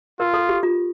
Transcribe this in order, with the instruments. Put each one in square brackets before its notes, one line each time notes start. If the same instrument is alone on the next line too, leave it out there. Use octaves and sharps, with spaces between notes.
[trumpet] F4 [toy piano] A#4
[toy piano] A4
G4
F4